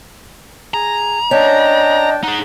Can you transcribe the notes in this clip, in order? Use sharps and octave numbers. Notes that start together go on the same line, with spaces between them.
G#4 A#5
C#4 D4 D#5 G5 A5
D#4 G#4 F#5